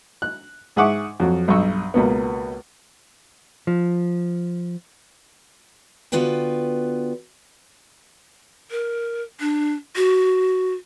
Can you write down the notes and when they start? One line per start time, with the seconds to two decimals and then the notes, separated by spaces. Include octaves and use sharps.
0.22 F#6
0.76 G#2 G#4 E5 F#5 C#6 D6
1.20 F2 F#3
1.48 B1 G2 D#5 C#6 E6
1.94 C#2 B2 A#3 B3
3.67 F3
6.12 D3 B3 F4 F#4 B4 G5
8.71 A#4
9.40 D4
9.96 F#4